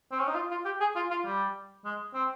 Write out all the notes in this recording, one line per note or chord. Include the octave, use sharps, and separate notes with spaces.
C4
C#4
D#4
F4
F4
G4
G#4
F4
F4
G3
G#3
C4